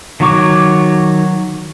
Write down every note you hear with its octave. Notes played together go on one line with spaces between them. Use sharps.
D#3 F#3 F#4 C#5 D6